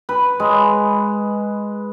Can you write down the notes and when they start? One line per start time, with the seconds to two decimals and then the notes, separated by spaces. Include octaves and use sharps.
0.09 B4
0.40 G#3